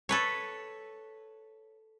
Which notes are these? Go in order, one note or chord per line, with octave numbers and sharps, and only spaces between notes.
A4 B4 C#5